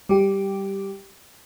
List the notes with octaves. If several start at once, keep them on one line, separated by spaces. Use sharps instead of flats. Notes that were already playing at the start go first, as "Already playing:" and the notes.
G3 G4